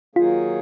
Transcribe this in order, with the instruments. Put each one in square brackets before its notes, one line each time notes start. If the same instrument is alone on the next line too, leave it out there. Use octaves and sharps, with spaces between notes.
[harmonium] D#3 F#3 A#3 D#4 G#4 [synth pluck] F4